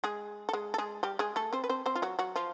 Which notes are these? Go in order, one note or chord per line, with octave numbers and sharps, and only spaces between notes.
G#3 G#4
A4
G#3 G#4
A4
G#3 G#4
G3 G4
G#3 G#4
A3 A4
C4 C5
B4
C4 C5
C4 C5
F4
F#3 F#4
F#3 F#4
F3 F4